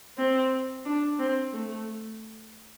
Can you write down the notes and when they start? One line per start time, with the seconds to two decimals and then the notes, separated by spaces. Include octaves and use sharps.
0.18 C4
0.85 D4
1.19 C4
1.52 A3